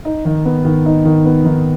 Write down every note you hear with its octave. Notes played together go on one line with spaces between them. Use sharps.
D#4
D#3
B3
D#3
D#4
D#3
B3
D#3